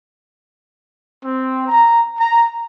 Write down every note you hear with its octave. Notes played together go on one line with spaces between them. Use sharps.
C4
A#5
A#5